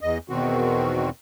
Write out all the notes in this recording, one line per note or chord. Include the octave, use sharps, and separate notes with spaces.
E2 D#5
E2 B2 D#3 C4 F#4